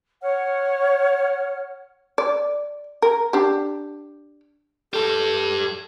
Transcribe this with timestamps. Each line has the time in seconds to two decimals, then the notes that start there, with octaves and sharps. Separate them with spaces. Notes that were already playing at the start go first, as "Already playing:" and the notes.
0.22 C#5 F#5 F6
2.18 D5
3.02 A#4
3.33 D4 G4
4.94 G4 A4 A5